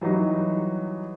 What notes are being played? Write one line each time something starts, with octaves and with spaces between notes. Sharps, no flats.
E3 F#3 G3 D#4